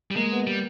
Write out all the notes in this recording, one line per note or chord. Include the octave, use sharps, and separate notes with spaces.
G3
G#3 A#3
B3
G3